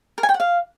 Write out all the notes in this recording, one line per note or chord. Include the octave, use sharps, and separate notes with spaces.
A#4
G#5
G5
F#5
F5